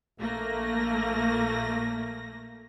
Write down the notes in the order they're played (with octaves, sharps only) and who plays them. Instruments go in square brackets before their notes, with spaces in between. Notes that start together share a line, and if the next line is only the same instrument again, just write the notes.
[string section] A#1 A3 A#3 A#6